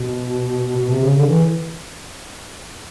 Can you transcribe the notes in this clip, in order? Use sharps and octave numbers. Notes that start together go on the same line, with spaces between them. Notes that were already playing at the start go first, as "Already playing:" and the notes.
Already playing: B2
B2
C3
C#3
D3
E3